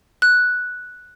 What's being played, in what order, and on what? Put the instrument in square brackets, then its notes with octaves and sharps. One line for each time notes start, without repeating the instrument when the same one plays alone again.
[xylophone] F#6